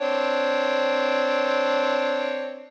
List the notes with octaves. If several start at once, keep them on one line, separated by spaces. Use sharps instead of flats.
C4 D4 C#5